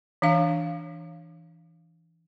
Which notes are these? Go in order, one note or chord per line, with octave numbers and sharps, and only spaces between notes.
E3 D4 F5